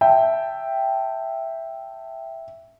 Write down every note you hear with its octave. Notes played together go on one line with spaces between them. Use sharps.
E5 G5 A5